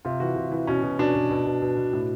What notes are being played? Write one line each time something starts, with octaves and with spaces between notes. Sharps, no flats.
C3 F4
E3 F#4
C3
E3
B2 C#4
B2
B2 D4
B2
B2
B2
B2
B2
A2